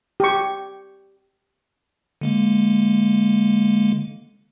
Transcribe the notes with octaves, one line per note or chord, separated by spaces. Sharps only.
G4 C#6
D3 G#3 A#3